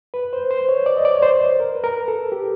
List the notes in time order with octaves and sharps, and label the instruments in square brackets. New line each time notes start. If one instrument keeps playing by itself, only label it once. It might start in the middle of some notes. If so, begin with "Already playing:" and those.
[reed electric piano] B4
C5
C5
C#5
D5
D#5
D5
C#5
C5
A#4
B4
A#4
A4
G4